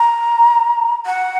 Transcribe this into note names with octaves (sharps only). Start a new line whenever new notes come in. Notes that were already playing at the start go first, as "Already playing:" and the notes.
Already playing: A#5
F#5